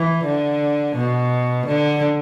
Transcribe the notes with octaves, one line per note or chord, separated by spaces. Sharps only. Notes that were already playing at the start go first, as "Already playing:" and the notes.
Already playing: E3
D3
B2
D3